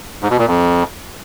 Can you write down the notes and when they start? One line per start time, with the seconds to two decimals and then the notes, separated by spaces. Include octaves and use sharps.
0.22 G#2
0.31 B2
0.39 A#2
0.47 F2